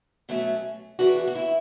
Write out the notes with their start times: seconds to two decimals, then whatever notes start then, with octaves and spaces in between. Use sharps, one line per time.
0.29 B2 F#3 A3 C#4
0.99 C#3 E3 B3 D4 F#4
1.27 F#4
1.35 E4